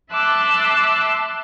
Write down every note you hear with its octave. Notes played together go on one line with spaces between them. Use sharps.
E5 A5 C6 D6 E6 F#6